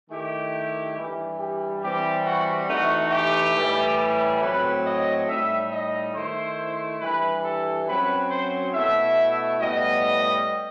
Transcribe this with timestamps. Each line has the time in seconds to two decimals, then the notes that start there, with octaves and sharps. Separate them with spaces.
0.10 D#3 A3 E4 G4
0.97 G2 E3 G3
1.39 G4
1.83 E3 G3 C4 G4
2.25 F#4
2.69 E3 A3 D#4 F#4
3.12 G4
3.55 A2 E3 G3
4.42 A2 F#3 C4 B4
4.85 D#5
5.28 A2 G3 D#4 E5
5.72 D#5
6.14 D#3 A3 E4 C5
7.00 G2 E3 G3 B4
7.44 A4
7.87 F#2 F#3 C4 B4
8.31 C5
8.73 B2 A3 E4 E5
9.60 A2 G3 B3 D#5